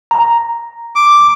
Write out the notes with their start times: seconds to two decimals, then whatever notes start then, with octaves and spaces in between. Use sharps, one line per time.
0.11 A#5
0.95 D6